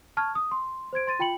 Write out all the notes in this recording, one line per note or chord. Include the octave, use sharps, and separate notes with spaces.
A5 C#6 F6 G#6
D#6
C6
C5 C6 G#6 D7
C6 A6 D#7
F4 G5 B5 C#7 F#7